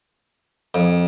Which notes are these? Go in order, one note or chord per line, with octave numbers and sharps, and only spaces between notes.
F2